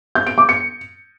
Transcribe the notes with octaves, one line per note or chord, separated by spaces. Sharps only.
G6
D7
D6
C#7